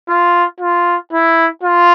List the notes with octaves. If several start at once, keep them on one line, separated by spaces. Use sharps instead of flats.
F4
F4
E4
F4